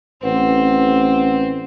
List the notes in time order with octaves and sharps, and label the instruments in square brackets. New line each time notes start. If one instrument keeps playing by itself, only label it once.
[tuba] A1 [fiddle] C4 [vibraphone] B4 F#5